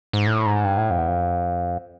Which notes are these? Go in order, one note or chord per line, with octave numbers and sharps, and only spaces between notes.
G#2
A2
G#2
G2
A2
F2
E2
F2